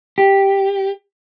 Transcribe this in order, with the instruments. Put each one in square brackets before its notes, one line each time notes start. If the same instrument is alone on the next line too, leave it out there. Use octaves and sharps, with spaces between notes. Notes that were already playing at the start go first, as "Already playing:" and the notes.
[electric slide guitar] G4